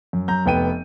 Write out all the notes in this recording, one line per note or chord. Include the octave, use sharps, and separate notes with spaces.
F#2
F#2 A#5 G6
F1 B3 G5 D#7